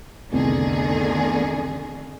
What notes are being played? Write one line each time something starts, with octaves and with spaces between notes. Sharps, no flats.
C2 F2 D3 D#3 A3 B3 G#4